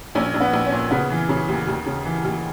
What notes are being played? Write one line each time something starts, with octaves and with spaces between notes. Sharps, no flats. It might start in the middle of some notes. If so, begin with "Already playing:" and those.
A#1 C#4
A#1
B3
A#1
C#4
A#2
C#3 B3
E3
C#3
D#2
D#2
C#3
E3
D#2